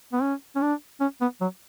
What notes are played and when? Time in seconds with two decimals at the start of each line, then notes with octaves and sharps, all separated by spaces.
0.13 B3
0.22 C#4
0.56 C#4
0.62 D4
1.01 C#4
1.21 B3
1.41 F#3